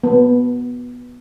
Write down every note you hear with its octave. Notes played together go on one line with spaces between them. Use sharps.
B3